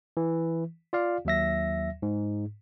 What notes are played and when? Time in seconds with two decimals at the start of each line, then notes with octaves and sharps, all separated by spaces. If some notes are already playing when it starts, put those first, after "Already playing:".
0.17 E3
0.93 F4 D5 F5
1.25 D#2 F#3 E5 A#6
2.02 G#2